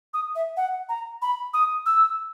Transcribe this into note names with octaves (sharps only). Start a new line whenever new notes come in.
D#6
E5
F#5
A#5
B5
D#6
E6